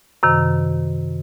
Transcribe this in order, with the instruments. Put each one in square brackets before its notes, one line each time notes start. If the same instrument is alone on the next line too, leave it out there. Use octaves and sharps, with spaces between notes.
[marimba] F#2 C3 D#3